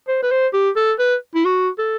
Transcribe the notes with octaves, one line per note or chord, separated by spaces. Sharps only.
C5
B4
C5
G4
A4
B4
E4
F#4
A4